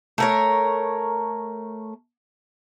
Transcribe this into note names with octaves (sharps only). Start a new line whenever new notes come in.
A3 A#4 C#5